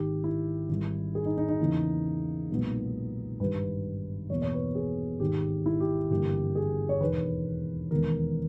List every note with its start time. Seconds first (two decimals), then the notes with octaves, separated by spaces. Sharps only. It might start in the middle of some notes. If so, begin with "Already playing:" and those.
Already playing: G#1 G#2 D#3 G4
0.24 E4
0.69 G#1 G#2 D#3 G3
1.15 G#4
1.25 D#4
1.37 D#4
1.48 D#4
1.59 E2 C#3 E3 A#3
2.50 B1 A#2 G#3 B3
3.40 G#1 G2 D#3 G3 B4
4.30 E2 B2 A#3 C#5
4.42 C#5
4.53 B4
4.75 G#4
5.20 G#1 G#2 D#3 G4
5.66 E4
5.80 G4
6.10 G1 G2 E3 A#3 G4
6.55 G#4
6.89 C#5
7.00 E1 D#2 D#3 B4
7.91 E1 D#2 D#3 G#3 B3 A#4